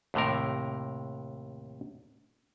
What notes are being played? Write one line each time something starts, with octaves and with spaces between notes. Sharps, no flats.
D#2 A2 C3 A#4